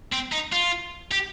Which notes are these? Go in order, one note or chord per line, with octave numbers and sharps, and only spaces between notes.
C4
D#4
F4
G4